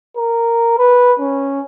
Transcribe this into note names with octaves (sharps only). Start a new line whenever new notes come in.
A#4
B4
C#4